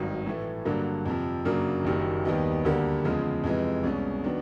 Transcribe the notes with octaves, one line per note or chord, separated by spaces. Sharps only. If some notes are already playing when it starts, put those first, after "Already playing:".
Already playing: G#1 G2 D#3 F#3
A2 E3 A3
G2 D3 F#3 A#3
F2 C3 F3
F#2 C#3 F#3 A#3 D4
F#1 F#2 D#3 G3
D#2 D#3 G3 B3 D#4
D2 D3 G3 A#3
E2 C#3 F3 G#3
F2 C3 E3 G#3
C2 B2 G#3 C#4
D#3 F#3 B3 D4